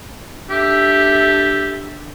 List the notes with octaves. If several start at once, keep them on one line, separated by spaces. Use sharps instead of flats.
D4 G4 A4 E5